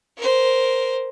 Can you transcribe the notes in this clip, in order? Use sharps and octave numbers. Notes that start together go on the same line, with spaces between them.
A#4 C5